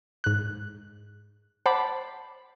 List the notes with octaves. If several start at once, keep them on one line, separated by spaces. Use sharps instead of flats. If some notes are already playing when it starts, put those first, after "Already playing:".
G#2 F#6
C5 F#5 A5 B5 D6